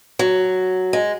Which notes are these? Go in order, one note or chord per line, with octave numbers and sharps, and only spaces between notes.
F#3
G#3